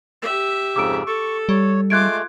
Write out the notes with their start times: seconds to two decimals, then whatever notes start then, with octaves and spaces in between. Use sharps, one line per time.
0.22 G4 E5
0.76 F2 G#2 C#3 D6 E6 D7
1.07 A4 C#6
1.49 G3 C#5
1.90 G#3 A3 F4 D6 F#6 G#6 D7